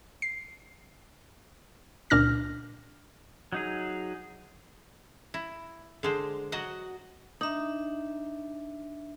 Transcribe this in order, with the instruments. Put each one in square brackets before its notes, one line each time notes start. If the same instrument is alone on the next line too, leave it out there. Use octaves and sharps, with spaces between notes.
[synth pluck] C7
C#2 A#2 D4 F6 A#6
[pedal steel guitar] F#3 D#4 G#4
[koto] E4
D3 G#3 C5
F#3 F#4 D#5 F#5
[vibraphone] D4 E5 [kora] D#4